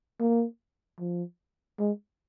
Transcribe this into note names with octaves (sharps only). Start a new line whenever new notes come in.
A#3
F3
G#3